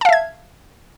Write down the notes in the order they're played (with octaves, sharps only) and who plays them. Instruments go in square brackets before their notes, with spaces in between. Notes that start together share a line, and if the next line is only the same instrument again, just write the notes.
[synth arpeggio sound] A5
F5
E5
G#6